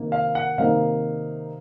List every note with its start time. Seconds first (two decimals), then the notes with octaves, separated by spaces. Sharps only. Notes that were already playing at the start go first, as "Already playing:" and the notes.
Already playing: C3 D#3 A#3 D#4
0.12 F5
0.35 F#5
0.58 C3 D#3 A#3 D#4 F5